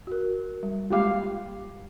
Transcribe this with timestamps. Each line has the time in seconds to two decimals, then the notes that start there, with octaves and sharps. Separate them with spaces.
0.07 F#4 A#4
0.63 G3
0.90 G#3 A#3 F4 G4 F5 D6